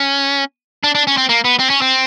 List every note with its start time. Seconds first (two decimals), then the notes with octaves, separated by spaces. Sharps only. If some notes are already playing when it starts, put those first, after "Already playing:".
Already playing: C#4
0.84 D4
0.95 D4
1.07 C#4
1.17 C4
1.29 A#3
1.44 B3
1.59 C4
1.70 C#4
1.82 C4